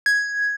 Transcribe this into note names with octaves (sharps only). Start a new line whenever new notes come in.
G#6